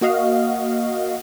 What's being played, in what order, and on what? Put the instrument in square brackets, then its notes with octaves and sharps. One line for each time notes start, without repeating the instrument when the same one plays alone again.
[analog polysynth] A#3 F#4 D#5 F5